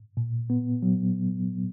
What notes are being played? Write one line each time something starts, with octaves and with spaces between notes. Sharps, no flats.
A#2
B3
F#3